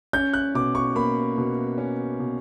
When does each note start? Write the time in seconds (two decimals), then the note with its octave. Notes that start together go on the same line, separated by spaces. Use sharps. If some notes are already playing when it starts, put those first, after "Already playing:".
0.13 C#4 G6
0.34 F#6
0.55 B2 D6
0.75 C#6
0.95 A#3 B5
1.38 B2
1.78 C#4
2.20 B2